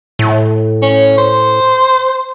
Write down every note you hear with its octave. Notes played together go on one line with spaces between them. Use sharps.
A2
C#4
C5